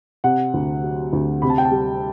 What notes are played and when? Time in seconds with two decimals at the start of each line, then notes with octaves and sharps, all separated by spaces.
0.24 C3 F#5
0.54 D2
0.83 F#3
1.13 D2
1.42 C3 B5
1.50 A5
1.58 G5
1.65 A5
1.72 G3